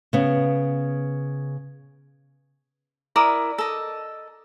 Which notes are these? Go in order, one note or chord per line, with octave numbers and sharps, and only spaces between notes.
C#3 B3
E4 A#4 D5 D#6
A4 D#5